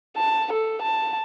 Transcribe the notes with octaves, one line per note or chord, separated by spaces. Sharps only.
A5
A4
A5